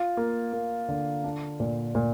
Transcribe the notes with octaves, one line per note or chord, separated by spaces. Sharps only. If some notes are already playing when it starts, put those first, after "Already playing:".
Already playing: F4
A#3
A#3
D3
D4
A#2
A#2